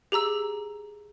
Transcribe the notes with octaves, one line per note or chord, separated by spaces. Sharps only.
G4 G#4 A#5 E6